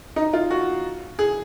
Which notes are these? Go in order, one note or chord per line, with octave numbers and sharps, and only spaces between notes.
D#4
F4
F#4
G#4